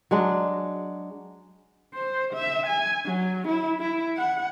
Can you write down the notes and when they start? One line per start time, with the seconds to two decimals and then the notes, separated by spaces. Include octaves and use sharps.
0.11 F#3 G#3 D4
1.94 C5
2.33 E5
2.66 G#5
3.05 F#3
3.48 E4
3.80 E4
4.18 F#5